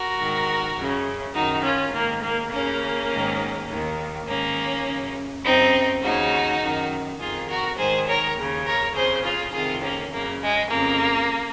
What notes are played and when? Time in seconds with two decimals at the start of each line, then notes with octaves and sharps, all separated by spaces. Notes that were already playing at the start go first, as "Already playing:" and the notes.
Already playing: F#4 A#4
0.18 G#2 D#3
0.76 F#2 C#3
1.35 F#2 D#3 D#4 F#4
1.64 C#4 F4
1.93 G#2 D#3 A#3
2.22 A#3
2.51 D#2 C#3 A#3 C#4
3.10 G#2 D#3
3.68 D#2 D#3
4.27 G#2 D#3 A#3 C#4
4.85 F#2 C#3
5.43 F#2 C#3 C4 D#4
6.02 D#2 C#3 D#4 F#4
6.61 F#2 D#3
7.19 F2 D#3 F4 G#4
7.48 F#4 A#4
7.77 G#2 D#3 G#4 C5
8.07 A#4 C#5
8.36 D#2 C#3
8.65 A#4 C#5
8.95 F2 C#3 G#4 C5
9.23 F4 G#4
9.52 F2 C3 D#3 F4 G#4
9.82 A#3 C#4
10.11 F#2 C#3 A#3
10.41 G#3
10.69 F2 C#3 A#3